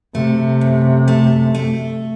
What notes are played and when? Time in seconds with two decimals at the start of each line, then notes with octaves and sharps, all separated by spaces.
0.15 C3 A3
0.61 F#2
1.08 A3
1.55 A3